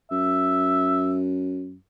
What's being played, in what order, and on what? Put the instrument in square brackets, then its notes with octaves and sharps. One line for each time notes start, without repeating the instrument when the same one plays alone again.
[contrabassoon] F#2 [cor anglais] E5